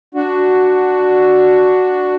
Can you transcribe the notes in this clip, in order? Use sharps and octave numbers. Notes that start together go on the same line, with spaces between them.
D4 F#4